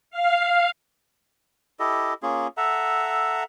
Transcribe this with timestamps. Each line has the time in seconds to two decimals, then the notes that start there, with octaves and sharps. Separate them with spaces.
0.11 F5
1.80 E4 G4 A4 D#5
2.23 A#3 C#4 F4 G#4
2.57 A4 E5 F#5 A#5